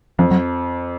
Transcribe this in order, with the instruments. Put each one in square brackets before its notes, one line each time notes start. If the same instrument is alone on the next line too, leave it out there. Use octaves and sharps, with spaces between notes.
[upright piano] F2 [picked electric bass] F3
[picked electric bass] F#3